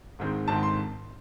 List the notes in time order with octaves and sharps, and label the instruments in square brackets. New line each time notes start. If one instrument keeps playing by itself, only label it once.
[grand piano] G#1 G#2 D#3 G#3 C4
G#1 G#2 D#3 G#3 C4 A5
C6